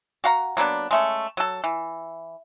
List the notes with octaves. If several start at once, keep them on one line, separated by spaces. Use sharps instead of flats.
F#4 F5 F#5 A#5
F#3 A#3 B3 D4
G#3 A3 C#4
F#3 A4
E3